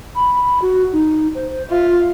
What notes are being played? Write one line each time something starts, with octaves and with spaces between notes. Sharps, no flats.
B5
F#4
D#4
C5
F4 E5